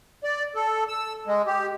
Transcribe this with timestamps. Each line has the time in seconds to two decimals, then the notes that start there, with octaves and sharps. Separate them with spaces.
0.24 D5
0.55 A4
0.88 E6
1.27 G#3
1.47 G4